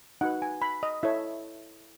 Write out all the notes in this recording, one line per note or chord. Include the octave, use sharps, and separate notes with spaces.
D#4 F#4 B4 F#5
G#5
B5
D#5
E4 A4 C#5 E5